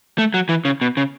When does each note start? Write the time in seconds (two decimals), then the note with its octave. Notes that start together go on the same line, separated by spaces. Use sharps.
0.18 A3
0.34 F#3
0.49 E3
0.65 C#3
0.81 B2
0.97 C#3